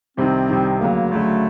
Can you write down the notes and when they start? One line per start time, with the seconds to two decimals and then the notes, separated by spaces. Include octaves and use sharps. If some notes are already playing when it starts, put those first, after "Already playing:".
0.17 C2 C3 D#3 C4
0.49 C2 C3 D#3
0.80 D2 C#3 F#3 A#3
1.11 D2 C#3 F#3 A3